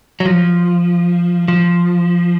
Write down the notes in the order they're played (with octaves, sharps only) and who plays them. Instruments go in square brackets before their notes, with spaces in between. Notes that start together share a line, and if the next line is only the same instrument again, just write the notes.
[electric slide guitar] F#3
F3
F3